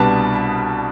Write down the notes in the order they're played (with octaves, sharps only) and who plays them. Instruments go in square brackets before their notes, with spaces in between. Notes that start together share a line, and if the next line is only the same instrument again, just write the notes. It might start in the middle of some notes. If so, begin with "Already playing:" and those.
Already playing: [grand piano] C2 B2 G3 B3 D4 A5